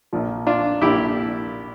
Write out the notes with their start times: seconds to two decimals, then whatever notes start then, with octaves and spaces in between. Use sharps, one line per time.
0.13 A#1 A#2 F3
0.47 D4 F4
0.81 A#1 A#2 F3 E4 G4